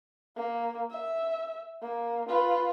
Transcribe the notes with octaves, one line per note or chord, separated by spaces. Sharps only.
A#3
E5
A#3
F4 B4